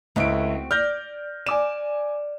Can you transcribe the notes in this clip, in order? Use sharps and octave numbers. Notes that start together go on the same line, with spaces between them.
C#2 A3 C4 E4 F#4 D7
D5 F6 G6 A#6
D5 G#5 D6 E7